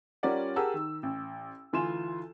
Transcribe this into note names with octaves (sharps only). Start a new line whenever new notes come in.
G3 C#4 F4 A#4 D5 F#5
G4 G#4 A#4 F#5 A5 E6
D#3
A1
D2 E3 F4 G#5 C6 E7